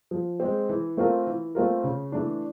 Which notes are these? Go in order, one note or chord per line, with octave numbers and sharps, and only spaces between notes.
F3
G#3 C4
E3
A3 C4 F4 A#4
E3
A3 C4 F4 A#4
C#3
E3 A3 D4